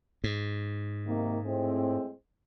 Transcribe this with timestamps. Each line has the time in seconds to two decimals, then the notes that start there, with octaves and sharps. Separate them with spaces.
0.24 G#2
1.06 C3 D#3 A#3
1.44 A2 G#3 C4